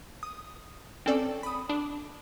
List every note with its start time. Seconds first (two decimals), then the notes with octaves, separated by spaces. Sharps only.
0.23 D#6
1.06 C4 C#4 A4 D5
1.43 B5 D#6
1.69 D4